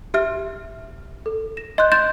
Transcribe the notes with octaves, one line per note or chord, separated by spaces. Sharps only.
G4 E5 F6
A4
A#6 E7
D#5 C6 F#6 G6
C6 G6 A6 E7